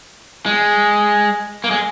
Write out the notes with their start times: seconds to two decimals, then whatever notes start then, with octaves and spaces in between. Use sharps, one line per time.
0.46 G#3
1.64 A#3
1.71 G#3